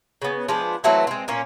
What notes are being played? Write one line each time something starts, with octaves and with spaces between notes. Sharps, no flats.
C#3 B3
F3 G#3 B3 D4
E3 F#3 A3 C4
G#3 C4
A#2 A#3 C#4